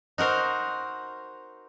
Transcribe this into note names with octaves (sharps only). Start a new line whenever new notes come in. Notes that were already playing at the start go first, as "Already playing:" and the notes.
D#4 F#4 A#4 C5